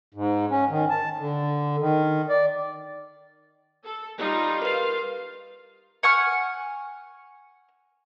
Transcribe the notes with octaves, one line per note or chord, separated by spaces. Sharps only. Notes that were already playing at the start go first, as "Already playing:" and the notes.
G#2
C#4
D#3
A5
D3
D#3
D5
A4
G3 D#4 F4
F4 A#4 B4 F5
F#5 G#5 C#6 F6